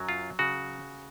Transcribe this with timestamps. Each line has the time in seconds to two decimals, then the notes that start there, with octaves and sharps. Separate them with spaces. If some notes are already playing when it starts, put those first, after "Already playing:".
Already playing: F#2 F#3
0.09 F4
0.39 C#3 F#4